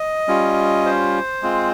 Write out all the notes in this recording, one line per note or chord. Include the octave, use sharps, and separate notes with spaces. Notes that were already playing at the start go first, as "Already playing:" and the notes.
Already playing: D#5
G3 C#4 F4
C5
G#3 C4 F4